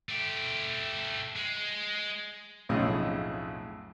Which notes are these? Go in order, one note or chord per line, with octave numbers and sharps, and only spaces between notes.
A3 G4
G#3
B1 F2 A2 C#3 D#5